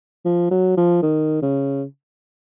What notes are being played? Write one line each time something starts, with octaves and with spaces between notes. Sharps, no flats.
F3
F#3
F3
D#3
C#3